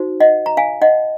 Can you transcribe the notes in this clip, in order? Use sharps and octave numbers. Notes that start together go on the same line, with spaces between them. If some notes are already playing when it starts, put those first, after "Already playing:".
Already playing: D#4 F#4 C5
D#5 F#5
A#5
F5 G#5
D#5 F#5